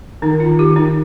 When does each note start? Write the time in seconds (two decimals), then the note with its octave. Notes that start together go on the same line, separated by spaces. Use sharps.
0.22 D#3 D#4
0.40 F4
0.46 D#3
0.59 G4
0.70 D#3
0.76 D#4